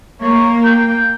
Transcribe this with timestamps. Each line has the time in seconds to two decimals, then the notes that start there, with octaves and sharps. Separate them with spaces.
0.22 A#3 C#5
0.64 G5